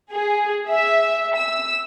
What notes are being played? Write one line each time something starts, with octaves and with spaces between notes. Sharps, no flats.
G#4
E5
E6